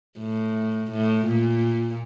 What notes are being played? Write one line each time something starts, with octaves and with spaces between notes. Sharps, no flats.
A2
A2
A#2